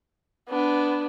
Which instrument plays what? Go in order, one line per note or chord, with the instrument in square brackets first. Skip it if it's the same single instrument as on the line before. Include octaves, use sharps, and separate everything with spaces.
[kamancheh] B3 D4